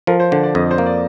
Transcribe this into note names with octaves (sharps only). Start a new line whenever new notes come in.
F3 A#4
C5
D3 D5
D5
F2 D#5
C5
A#3
D5